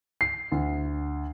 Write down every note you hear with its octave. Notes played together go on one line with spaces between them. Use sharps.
C7
D2